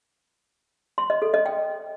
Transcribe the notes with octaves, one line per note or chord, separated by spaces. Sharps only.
C6
D#5
A4
D#5
G5